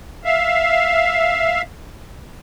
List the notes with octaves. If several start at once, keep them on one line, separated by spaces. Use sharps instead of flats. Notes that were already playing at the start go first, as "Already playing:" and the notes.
E5 F5